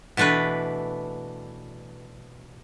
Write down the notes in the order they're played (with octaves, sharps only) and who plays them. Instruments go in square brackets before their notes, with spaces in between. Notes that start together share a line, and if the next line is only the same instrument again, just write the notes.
[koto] B2 E3 A3 D4 B4